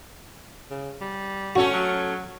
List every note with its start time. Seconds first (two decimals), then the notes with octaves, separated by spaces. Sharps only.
0.71 C#3
1.01 G3
1.56 A3 C#4 F#4 A4
1.73 F#3